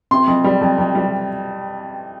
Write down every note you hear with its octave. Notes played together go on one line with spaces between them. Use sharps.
C3 C6
F2
G3
F2
F2
G3